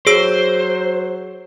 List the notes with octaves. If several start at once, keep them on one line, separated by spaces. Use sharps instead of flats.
F#3 G#4 C5 E6